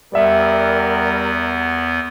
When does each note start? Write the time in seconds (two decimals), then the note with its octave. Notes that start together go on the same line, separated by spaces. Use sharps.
0.13 E2 G3 B3 A#4 D5 E5